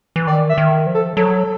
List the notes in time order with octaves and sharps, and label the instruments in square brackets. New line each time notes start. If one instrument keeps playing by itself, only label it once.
[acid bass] E3
[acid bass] D#3 [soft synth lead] D5
[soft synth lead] E5
[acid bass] D#3
F3
[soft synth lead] A4
[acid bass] F#3 [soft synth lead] A4